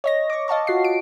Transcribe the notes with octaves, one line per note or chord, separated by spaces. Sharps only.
C#5 D#5 A#6
C#6 D6
D#5 F5 A5 C#6
F4 F#4 F#5 C7
D7